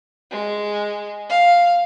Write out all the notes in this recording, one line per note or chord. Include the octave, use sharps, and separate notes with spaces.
G#3
F5